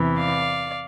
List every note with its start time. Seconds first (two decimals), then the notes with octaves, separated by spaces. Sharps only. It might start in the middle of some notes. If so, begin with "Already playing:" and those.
Already playing: E2 C3 E3
0.17 D5 F5